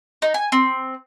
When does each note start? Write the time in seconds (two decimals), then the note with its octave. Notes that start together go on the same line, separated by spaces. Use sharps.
0.22 D#4
0.34 G#5
0.52 C4